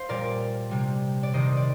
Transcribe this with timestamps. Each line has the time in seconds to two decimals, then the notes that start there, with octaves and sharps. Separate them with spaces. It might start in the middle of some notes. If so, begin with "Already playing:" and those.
Already playing: C5 F5
0.09 A#2 G3 A#4 D5
0.71 C3 G3
1.23 D5
1.33 C3 D#3 G3 C5 D#5
1.57 D5